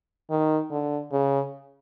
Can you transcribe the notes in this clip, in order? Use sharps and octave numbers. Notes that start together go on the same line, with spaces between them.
D#3
D3
C#3